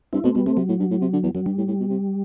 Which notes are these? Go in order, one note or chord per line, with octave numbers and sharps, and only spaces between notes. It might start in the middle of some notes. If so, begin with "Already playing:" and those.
G2 C4 E4
B2 A3 C4
B2 G3 B3
C3 A3 C4
C3 F#3
A2
G2
A2
C3
D3
E2
F#2 F#3
G2 G3
A2
A2
B2
C3